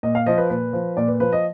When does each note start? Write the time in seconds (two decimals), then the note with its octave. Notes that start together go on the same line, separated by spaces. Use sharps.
0.03 A#2 D#5
0.15 F5
0.26 F3 D#5
0.38 B4
0.50 A#2 B4
0.73 F3
0.97 A#2 D5
1.08 B4
1.20 F3 B4
1.33 D#5